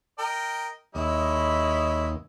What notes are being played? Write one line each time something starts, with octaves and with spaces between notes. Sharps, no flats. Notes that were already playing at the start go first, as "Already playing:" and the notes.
A#4 D#5 G5
D#2 G#3 E4 C#5 D#5 B5